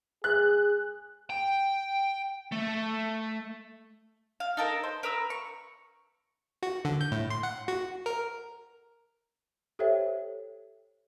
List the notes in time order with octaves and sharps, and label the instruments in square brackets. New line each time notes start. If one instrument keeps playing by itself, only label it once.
[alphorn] G#4 [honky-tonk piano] F#6
[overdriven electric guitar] G5
A3
[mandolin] F5
D#4 A4 A#4
C5
A#4 B4 A#5 E6
C#6
[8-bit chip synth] F#4
D3
G6
A2
C6
F#5
F#4
A#4
[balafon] G4 A4 C5 C#5 E5 G5